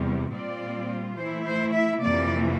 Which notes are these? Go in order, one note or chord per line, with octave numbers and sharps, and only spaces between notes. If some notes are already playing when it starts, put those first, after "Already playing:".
Already playing: E2 C3 G3
A#2 G3 C4 F4 D5
E3 A3 E4 C5
C5
E5
F2 C3 E3 A#3 D5